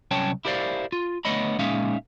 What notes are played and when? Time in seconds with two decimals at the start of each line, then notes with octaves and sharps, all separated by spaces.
0.11 C2 F#3 C#4 C#5 G5 A5
0.45 E4 G4 A#4 C5 D5 F5
0.92 F4
1.25 D3 A3 B3 C#5 D#5 B5
1.59 A#2 G#3 C#4 D#4 E5 F5